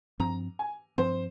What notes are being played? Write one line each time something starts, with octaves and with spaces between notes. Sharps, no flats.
G2 F3 C4 A#5
G#5
G2 F3 C4 C5